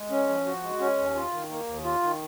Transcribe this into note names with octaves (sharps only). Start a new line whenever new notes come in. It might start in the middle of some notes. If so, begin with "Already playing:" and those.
Already playing: G#3
C#4
F3
F#4
G#3
C#4
D#2
F4
D#3
A#3
D#2
F4
D#3